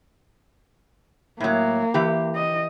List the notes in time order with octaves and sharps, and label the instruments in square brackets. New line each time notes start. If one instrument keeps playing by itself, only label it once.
[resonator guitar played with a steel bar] A2 F#3 [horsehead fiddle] A#3
[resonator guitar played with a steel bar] E3 G4
[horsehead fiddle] D#5